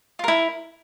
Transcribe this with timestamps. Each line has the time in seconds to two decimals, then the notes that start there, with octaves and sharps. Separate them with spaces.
0.19 F4
0.24 A#4
0.28 E4